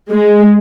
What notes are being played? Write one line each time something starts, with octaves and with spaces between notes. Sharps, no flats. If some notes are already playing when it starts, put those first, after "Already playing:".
G#3